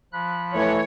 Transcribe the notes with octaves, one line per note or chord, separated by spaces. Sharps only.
F3 B5 F#6
E3 A3 C#5